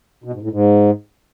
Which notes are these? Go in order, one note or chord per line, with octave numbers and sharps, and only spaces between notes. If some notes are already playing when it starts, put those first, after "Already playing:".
B2
G#2
A2
G#2